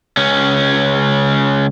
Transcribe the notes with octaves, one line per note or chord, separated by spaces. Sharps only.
C#2 C#4